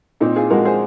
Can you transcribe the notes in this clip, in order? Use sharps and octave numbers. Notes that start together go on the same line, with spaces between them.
A#2 C4 D#4
F4 G#4
F3 G#3 F#4 A#4
G#4 C5